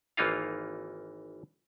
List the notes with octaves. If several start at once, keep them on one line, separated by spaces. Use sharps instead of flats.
G#1 E3 A#3 D#4 F4 F5